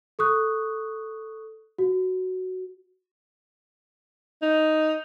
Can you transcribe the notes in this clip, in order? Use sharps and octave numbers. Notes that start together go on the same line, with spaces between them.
A4 C#6 D#6 F#6
F#4
D#4